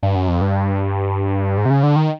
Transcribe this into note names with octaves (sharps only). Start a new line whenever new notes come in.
G2
F#2
F2
G2
G#2
C3
C#3
D3
D#3